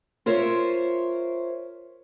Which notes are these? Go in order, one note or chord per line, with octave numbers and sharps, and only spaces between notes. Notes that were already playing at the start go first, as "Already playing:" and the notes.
F4 A#4 C5 C#5 E5